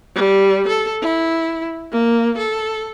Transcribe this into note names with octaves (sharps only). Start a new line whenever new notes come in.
G3
A4
E4
A#3
A4